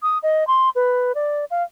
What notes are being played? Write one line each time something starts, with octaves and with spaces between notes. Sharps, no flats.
D#6
D#5
C6
B4
D5
F5